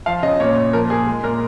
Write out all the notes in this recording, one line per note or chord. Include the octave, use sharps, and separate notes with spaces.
F3 F5
C#3 D#5
A#2 C#5
A#2
F3 A#4
A#2 G#4
G#3
A#2 A#4